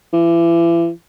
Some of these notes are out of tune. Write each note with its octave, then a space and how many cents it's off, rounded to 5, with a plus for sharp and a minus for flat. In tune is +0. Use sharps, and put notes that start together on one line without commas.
E3 +35